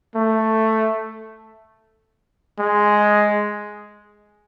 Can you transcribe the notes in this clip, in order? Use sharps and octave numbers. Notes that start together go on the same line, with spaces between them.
A3
G#3